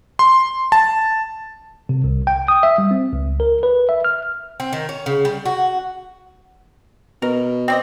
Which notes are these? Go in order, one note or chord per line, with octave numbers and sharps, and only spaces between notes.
C6
A5
C3
C2
G5
D#6
E5
G3
C4
C#2
A#4
B4
E5
F6
C4
D#3
C#4
C#3
G3
F#4
B2 A#4
C4 D5 D#5